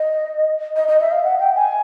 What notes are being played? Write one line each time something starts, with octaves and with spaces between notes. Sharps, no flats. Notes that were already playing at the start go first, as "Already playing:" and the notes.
Already playing: D#5
D#5
D#5
E5
F5
F#5
G5
G#5